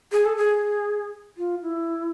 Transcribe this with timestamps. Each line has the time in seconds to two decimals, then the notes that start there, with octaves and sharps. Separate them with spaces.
0.12 G#4
0.25 A4
0.37 G#4
1.38 F4
1.62 E4